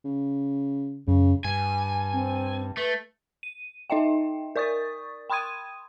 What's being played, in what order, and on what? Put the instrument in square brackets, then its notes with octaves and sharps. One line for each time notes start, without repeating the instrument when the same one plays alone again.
[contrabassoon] C#3
[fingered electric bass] F#2 [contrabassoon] C#3
[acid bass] G2 [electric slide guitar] G#5
[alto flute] C4
[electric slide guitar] A3 [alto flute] B4
[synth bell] D#7
D#4 D#5 E5 G5
A#4 D5 C#6 D#6 A6
G5 B5 C6 D#6 G#6 D#7